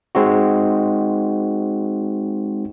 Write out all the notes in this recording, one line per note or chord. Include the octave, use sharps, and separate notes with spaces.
G#3 C4 D#4 F#4